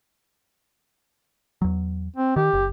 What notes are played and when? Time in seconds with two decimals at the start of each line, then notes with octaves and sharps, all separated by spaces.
1.62 E2 F#3
2.16 C4
2.36 D#3 G4
2.53 F#1